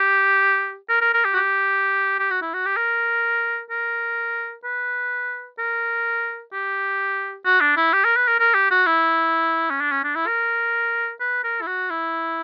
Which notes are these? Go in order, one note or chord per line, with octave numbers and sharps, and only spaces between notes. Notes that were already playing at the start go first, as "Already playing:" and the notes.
Already playing: G4
A#4
A#4
A#4
G4
F#4
G4
G4
F#4
E4
F#4
G4
A#4
A#4
B4
A#4
G4
F#4
D4
E4
G4
A#4
B4
A#4
A#4
G4
F#4
E4
C#4
D4
C#4
D4
E4
A#4
B4
A#4
E4
F#4
E4